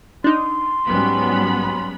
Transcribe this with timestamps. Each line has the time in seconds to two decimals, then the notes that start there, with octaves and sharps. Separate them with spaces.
0.24 D4 D#4 C6
0.87 G#2 F#3 G3 B3 C#4 B5